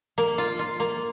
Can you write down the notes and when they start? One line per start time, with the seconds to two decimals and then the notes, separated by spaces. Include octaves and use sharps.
0.18 A#3
0.38 F4
0.59 F4
0.80 A#3